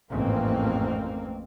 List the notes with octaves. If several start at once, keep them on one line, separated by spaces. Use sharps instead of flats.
A1 F2 G#2 A#3 C4